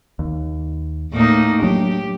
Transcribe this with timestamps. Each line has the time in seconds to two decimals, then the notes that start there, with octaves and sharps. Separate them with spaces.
0.19 D#2
1.13 A2 A#3 D#4
1.62 F#3 D4 G4